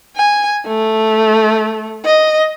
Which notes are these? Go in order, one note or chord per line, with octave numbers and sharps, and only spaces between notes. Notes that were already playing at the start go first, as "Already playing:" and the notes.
G#5
A3
D#5